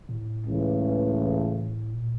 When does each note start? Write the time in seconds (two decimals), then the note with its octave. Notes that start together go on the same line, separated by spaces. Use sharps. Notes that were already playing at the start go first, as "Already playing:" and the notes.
0.09 A2
0.45 C#2 C#3 E3 A3
1.93 A#2